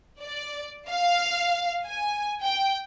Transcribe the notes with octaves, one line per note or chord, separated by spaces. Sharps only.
D5
F5
G#5
G5